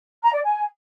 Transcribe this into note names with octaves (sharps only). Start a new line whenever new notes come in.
A#5
D5
G#5